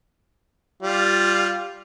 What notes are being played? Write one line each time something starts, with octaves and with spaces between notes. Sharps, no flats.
G3 F4